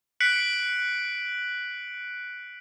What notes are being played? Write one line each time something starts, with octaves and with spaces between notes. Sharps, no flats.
F#6 B6 C#7 D7 F#7